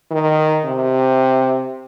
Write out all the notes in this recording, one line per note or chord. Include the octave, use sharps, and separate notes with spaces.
D#3
C3